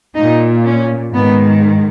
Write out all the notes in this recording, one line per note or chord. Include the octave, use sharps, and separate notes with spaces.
A#2 D#4
C#4
G#2 D#3 B3